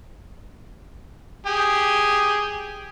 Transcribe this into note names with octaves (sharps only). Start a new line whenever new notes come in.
G4 G#4